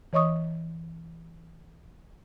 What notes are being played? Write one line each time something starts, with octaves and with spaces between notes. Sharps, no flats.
E3 C#5 D#5 C#6 D#6